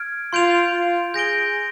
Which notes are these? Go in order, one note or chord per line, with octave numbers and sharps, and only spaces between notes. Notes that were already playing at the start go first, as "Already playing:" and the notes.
Already playing: F6 G#6 D7
F4 C6 G6 D7 F7
F4
G#4 G6 A#6 D7 G7